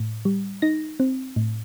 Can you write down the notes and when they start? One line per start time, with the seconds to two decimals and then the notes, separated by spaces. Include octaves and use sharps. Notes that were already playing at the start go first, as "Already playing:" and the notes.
Already playing: A2
0.25 G3
0.62 D#4 A#6
1.00 C4
1.36 A2